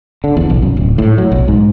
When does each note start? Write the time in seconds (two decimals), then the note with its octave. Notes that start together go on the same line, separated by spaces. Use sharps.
0.24 D3
0.37 E2
0.50 B1
0.62 F#2
0.77 D1
0.98 A2
1.18 F#3
1.32 B1
1.48 G#2